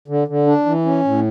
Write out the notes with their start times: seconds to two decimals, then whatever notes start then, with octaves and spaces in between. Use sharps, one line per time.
0.08 D3
0.28 D3
0.47 D4
0.66 E3
0.85 C#4
1.04 A2